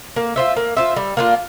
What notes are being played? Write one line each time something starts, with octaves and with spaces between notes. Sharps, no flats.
A#3
F4 C5 E5
A#3
F4 C5 E5
G3
A#3 D4 F4